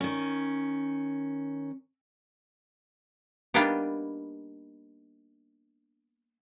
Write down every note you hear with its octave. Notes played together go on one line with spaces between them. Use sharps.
D#3 C#4
G3 A#3 B3 D4 D#4 G4